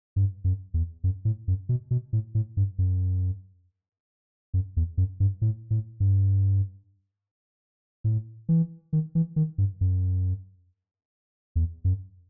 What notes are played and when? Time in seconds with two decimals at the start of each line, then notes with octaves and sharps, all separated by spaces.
0.16 G2
0.44 F#2
0.74 E2
1.04 F#2
1.25 A2
1.48 F#2
1.69 B2
1.91 B2
2.13 A2
2.35 A2
2.57 G2
2.78 F#2
4.54 F#2
4.77 E2
4.97 F#2
5.20 G2
5.42 A2
5.70 A2
6.00 G2
8.04 A2
8.49 E3
8.93 D#3
9.15 E3
9.36 D#3
9.58 G2
9.81 F#2
11.56 E2
11.84 F#2